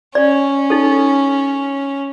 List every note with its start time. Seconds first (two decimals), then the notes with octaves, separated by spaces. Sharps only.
0.15 C#4 D5
0.70 D#4 A4